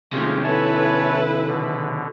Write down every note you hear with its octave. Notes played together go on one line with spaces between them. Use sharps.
C3 D#3 G#3 A3 C#4 F4 G4 G#4
E4 A4 B4 C#5 G#5 A5
B2 D3